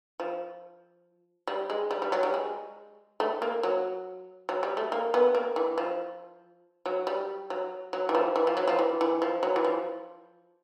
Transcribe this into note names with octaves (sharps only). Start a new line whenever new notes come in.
F3
G3
G#3
G3
G3
F#3
G3
G#3
A3
A#3
F#3
F#3
G3
A3
A#3
B3
A#3
E3
F3
F#3
G3
F#3
F#3
E3
F3
E3
F3
F#3
F3
E3
E3
F3
F#3
E3
F3